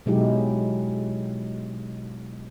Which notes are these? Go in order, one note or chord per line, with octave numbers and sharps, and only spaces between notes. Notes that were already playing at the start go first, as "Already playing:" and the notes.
B2 F#3 G#3 D#4 E4 G4